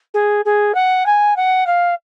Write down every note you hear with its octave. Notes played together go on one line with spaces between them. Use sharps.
G#4
G#4
F#5
G#5
F#5
F5